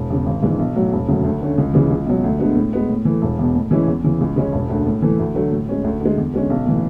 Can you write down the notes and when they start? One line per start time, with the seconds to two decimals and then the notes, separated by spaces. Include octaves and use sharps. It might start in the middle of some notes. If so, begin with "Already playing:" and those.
Already playing: E1
0.10 E2 C#3
0.26 G#1
0.42 G#2 E3 G#3 D4
0.59 B1
0.76 A2 F#3
0.93 E1
1.08 D2 C#3 F#3
1.24 D2
1.42 D3 A3 C#4
1.58 C#2
1.74 C#3 E3 G#3
1.90 C#2
2.06 B2 F#3
2.24 D2
2.39 D3 G#3 B3 D4
2.56 A2
2.73 G#3 B3
2.90 A2
3.05 E3 A3
3.22 E1
3.39 E2 B2
3.55 A2
3.71 E3 G#3 C#4 E4
3.88 E2
4.04 C#3 E3
4.21 C#2
4.36 C#3 G#3 C#4
4.53 E1
4.69 D2 D3
4.86 A2
5.02 E3 A3
5.19 D2
5.35 D3 F#3 A3
5.52 A2
5.69 G#3 C#4
5.84 D2
6.00 D3
6.05 G#3
6.18 E2
6.34 D3 G#3 C#4
6.50 B1
6.66 A2 E3